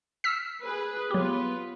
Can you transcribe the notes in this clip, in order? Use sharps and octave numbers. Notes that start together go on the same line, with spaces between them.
E6 F6 B6
G#4 B4
F#3 B3 F4 G4 B4